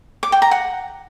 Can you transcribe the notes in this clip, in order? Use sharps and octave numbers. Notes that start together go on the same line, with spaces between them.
D6
G5
A#5
F#5